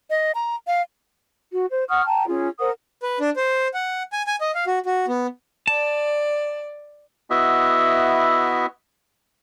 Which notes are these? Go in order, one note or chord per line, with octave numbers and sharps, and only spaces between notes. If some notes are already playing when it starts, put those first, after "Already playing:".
D#5
A#5
F5
F#4
C5
F#5 C#6 D#6 F6
G5 A5 A#5
C#4 F4 G#4
A#4 C5 F#5 D#6
B4
D4
C5
F#5
G#5
G#5
D#5
F5
F#4
F#4
B3
D5 A5
B3 E4 F#4 D#5 E5